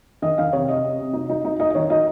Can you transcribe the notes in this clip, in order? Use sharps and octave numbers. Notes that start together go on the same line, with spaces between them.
D#3 D#5
D#3 F5
C3 C#5
C3 D#5
C3
C3
D#4
D#4
D#4
D#4 D#5
D#5
D#3 C#5
D#4 D#5